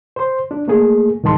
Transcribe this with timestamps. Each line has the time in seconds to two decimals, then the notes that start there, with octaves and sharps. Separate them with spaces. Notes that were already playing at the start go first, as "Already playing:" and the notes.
0.16 C5 C6
0.51 D4
0.68 A3 A#3 G#4
1.23 C2 G#2 D#3 A5 C6